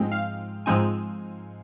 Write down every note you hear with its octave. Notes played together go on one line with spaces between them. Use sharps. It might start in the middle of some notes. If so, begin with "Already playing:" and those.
Already playing: G#2 F3 G#3 C4 D#4 G5
F5
G#2 F3 G#3 C4 D#4 G#5